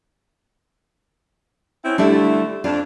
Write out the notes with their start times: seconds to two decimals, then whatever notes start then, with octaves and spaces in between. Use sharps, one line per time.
1.84 C4 C#4 E4
1.98 D3 G3 A3 D4 E4
2.64 F2 D4 F4